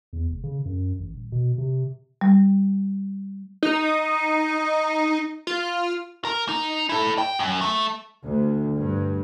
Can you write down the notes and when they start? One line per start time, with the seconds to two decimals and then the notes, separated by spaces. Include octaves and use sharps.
0.13 E2
0.29 F1
0.44 C#3
0.65 F#2
0.99 A1
1.14 D#1
1.32 B2
1.58 C3
2.21 G3
3.63 D#4
5.47 F4
6.25 A#4
6.49 D#4
6.89 E4 A4
7.18 G5
7.39 F#2
7.61 A3
8.24 D2
8.78 G2